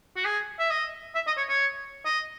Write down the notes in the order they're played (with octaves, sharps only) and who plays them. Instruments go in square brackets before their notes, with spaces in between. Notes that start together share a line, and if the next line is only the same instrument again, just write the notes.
[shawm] F#4
G#4
E5
D#5
E5
D#5
C#5
C#5
D#5